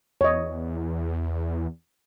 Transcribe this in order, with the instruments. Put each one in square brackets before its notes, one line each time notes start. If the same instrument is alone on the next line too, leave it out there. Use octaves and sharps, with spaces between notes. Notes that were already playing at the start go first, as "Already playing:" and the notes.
[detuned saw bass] E2 [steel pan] C#5 D#5